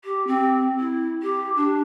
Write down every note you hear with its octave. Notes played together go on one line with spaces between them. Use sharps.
G4
C4
E4
G4
D4